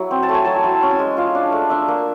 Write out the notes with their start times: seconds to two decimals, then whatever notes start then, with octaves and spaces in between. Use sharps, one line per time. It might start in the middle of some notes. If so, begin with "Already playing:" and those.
Already playing: F#3 E4
0.11 C4
0.23 A5
0.29 A3
0.34 G#5
0.44 F#3 A5
0.56 G#5
0.64 E4 A5
0.83 C#4
0.90 G#5
0.99 G#3
1.17 F4 F5
1.35 D4
1.52 A3
1.70 D4 E5
1.88 A#3